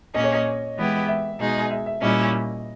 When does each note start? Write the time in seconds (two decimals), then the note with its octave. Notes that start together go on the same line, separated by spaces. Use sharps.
0.14 A#2 A#3 C#4 G#4 D#5
0.24 C#5
0.34 D#5
0.76 E3 G#3 B3 E4 G4
1.08 E5
1.39 B2 G#3 D#4 G#4
1.70 E5
1.86 E5
2.01 A#2 G3 C#4 E4 D#5